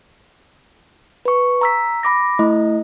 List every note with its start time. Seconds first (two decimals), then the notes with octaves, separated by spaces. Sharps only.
1.25 B4 C#6
1.61 A#5 E6 B6
2.03 B5 D6 A#6
2.39 A3 E4 D#5